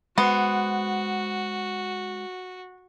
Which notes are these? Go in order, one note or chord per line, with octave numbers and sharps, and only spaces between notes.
G#3 B3 F#4 C5 C6